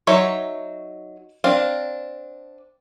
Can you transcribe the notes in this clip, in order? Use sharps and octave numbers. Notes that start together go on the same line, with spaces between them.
F#3 D#4 C#5 E5
C4 D4 F5